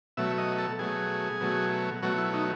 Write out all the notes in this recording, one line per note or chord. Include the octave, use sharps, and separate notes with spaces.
B2 F#3 A3 E5
D#5
A4
B2 F#3 A3 G#4
B2 F#3 A3
B2 F#3 A3 F#4
E4
D#4